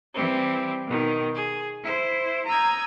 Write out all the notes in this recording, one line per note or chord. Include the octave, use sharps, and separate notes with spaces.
E3 G3 C4
B2 D#3
G#4
E4 C5
A#5 D#6 E6 G6 G#6